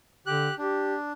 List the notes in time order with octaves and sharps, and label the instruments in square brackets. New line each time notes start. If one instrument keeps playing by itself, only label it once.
[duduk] D3 [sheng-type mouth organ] G4 F#6
[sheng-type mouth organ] D4 [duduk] G4